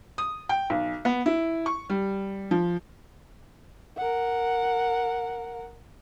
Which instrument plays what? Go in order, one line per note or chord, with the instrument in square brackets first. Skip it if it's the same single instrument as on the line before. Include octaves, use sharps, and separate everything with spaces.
[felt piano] D#6
G5
B1
B3
E4
C#6
G3
F3
[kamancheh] A#4 F#5